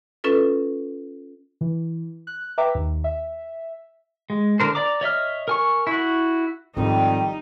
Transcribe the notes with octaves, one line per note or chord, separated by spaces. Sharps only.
C#4 F4 A4 B4
E3
F#6
B4 E5 G5 A#5 D6
D#2
E5
G#3
D3 A#4 C5
D5 A#5 D6
C#5 D#5 E5 F6
A#4 G#5 C#6
E4 F#4
G#1 F2 D#3 G3 D#4